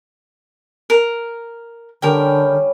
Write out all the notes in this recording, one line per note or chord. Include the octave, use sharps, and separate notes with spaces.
A#4
D3 G3 C#4 A#4 G5